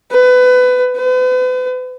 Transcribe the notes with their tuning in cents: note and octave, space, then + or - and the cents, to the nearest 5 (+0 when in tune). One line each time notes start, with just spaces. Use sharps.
B4 +25
B4 +40